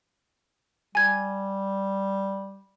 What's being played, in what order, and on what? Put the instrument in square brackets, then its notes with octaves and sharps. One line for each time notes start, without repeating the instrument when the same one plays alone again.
[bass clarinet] G3 [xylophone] G#5 G#6